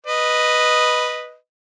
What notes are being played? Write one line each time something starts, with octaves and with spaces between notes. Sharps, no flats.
B4 D#5